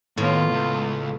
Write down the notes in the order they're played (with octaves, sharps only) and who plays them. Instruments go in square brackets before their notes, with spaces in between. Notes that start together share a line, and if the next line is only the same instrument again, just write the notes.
[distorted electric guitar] D#2 [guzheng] A2 [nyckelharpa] B3 F4
[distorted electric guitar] C#2